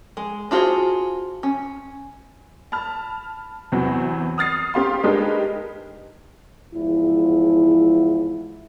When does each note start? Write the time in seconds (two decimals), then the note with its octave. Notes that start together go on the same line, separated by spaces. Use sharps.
0.17 G#3
0.51 D4 F4 F#4 G#4 C5
1.43 C#4
2.72 A5 B5 F6
3.72 E2 C3 E3 F#3
4.38 D#6 F6 A6 C7
4.74 C#4 G4 F5 C6
5.04 G#3 D4 D#4 G4 A#4 B4
6.74 E2 G#2 F3 E4